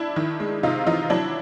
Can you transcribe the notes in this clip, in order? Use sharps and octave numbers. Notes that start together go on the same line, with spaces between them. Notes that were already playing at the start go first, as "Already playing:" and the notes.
Already playing: D4 E4
D#3
G#3
C3 D#4 F4
E3 D#4 F4
F#3 D4 E4